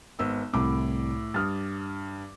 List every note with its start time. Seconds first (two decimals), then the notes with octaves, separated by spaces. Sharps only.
0.19 G#1 B3 E6
0.53 C2 A2 B5 D6
1.34 G2 D#6 F6 A6